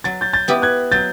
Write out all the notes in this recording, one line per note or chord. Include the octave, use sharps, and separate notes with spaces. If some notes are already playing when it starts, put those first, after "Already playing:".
F#3 A6
G6 A6
G6 A6
B3 E4 G4
F#6 G#6
F#3 G6 A6